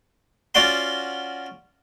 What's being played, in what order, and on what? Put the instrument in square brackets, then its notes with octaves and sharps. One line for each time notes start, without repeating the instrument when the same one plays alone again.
[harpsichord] C#4 F4 F#4 D5 F#5 C6